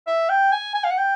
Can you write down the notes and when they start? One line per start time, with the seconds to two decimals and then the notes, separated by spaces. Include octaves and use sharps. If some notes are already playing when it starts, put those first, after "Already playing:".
0.07 E5
0.30 G5
0.52 G#5
0.75 G#5
0.84 F5
0.91 F#5
0.98 G5